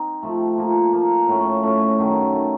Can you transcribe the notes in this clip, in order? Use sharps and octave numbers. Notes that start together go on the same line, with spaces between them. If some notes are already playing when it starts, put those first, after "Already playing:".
Already playing: C4 D#4
C3 F3 A3
F3 A#3 F4
F3 A#3 F4
A2 A3 C#4
A2 A3 C#4
F#2 D#3 A3
D#3 A3